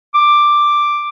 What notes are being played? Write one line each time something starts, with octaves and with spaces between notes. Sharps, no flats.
D6